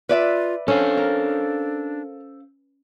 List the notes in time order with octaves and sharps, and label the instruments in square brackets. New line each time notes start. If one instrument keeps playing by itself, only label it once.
[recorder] F4 [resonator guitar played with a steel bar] B4 D5 E5
[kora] C#4 [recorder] D4 [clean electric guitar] A4 C5 F5
[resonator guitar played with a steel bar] A#4